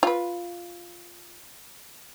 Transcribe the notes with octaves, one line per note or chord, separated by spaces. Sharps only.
F4 B4